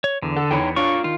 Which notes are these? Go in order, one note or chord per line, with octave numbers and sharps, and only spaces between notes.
C#5
E2 D3
A4 F#5
E2 D#4 C#5 G5 B5 C#7
D4 F4 C#5 D5 F5 C#6
D#3 F4